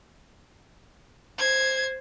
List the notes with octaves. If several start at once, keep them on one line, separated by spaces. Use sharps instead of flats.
C5 G#6